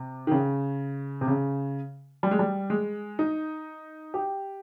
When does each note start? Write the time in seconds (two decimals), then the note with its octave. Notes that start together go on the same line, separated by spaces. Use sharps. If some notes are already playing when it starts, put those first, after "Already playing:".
Already playing: C3
0.27 D#3
0.32 C#3
1.21 C3
1.28 C#3
2.23 G3
2.31 G#3
2.39 G3
2.70 G#3
3.19 D#4
4.14 G4